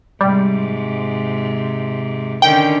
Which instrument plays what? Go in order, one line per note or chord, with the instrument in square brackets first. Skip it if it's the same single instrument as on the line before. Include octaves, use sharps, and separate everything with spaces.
[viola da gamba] G#2 C3 [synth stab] G3
[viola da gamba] D3 D#3 C#4 [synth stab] G5